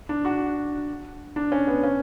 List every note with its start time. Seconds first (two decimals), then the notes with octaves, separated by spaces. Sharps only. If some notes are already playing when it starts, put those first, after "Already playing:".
0.09 D4
0.25 F#4
1.36 D4
1.52 C#4
1.67 B3
1.84 C#4